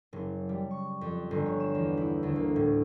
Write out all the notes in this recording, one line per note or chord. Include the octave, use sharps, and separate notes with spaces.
F#1
G3
C#6
F2
G1
C#5
E7
E2
E4
D2
A#3
A2